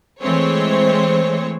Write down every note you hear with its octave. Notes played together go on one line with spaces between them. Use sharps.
E3 G#3 A3 C4 C5 C#5